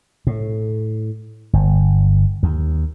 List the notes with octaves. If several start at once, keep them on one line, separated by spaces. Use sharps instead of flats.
A2
G1
D#2